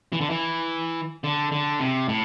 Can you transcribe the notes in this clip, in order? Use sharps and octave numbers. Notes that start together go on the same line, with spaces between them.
E3
D3
E3
D3
D3
C3
A2